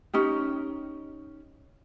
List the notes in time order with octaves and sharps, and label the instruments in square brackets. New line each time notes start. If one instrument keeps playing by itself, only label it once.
[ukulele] C#4 D#4 G4